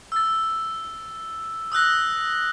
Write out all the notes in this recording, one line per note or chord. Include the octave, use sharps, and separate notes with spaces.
E6 A6
D#6 E6 F#6 A#6